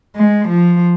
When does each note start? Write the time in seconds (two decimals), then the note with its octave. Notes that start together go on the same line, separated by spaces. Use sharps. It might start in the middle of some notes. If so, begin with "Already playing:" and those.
0.16 G#3
0.48 F3